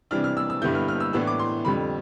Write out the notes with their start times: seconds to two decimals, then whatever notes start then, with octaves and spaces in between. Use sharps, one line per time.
0.11 C3 E3 G3 D4 F6
0.24 F6
0.37 E6
0.50 E6
0.62 G2 D3 G3 B3 E4 G6
0.75 F6
0.88 F6
1.00 E6
1.13 A2 E3 B3 D4 E6
1.27 D6
1.39 C6
1.65 F2 D3 G3 B5